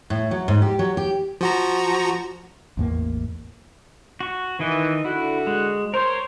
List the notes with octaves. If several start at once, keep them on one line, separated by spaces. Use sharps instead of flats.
A2
F#3
G#2
G4
F#3
G4
F3 F#4 A#5
A1 E2 A#3
F#4 C#6
D#3 E3 D#5
D3 E4 F#4
G#3
A#4 C5 C#5